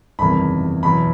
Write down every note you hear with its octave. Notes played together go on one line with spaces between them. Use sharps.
F#1 E2 C3 D#3 G3 B5
E2 B2 F#3 B5